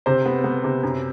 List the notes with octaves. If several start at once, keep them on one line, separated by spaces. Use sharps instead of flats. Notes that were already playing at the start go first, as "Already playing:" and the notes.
C3 C5
B3
B3
C3
F#2